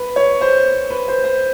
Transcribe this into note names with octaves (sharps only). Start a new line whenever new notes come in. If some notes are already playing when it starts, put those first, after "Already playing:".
Already playing: B4
C#5
C5
B4
C5
C5